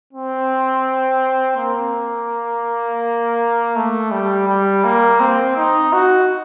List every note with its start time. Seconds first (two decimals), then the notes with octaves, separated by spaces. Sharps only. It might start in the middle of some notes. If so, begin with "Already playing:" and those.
0.13 C4
1.57 A#3
3.76 A3
4.11 G3
4.48 G3
4.84 A#3
5.20 C4
5.57 D#4
5.93 F#4